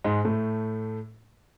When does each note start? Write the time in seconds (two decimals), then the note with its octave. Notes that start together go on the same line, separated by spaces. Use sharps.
0.04 G#2 G#3
0.25 A2 A3